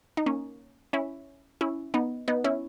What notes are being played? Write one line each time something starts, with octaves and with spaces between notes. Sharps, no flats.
D#4
A#3 C#4
C#4 E4
C#4 E4
B3 D#4
B3 D#4
C#4 E4